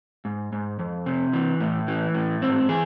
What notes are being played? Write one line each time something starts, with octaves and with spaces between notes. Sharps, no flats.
G#2
G#2
F2
C3
E3
A2
E3
A2
G#2 C4
E3 G#4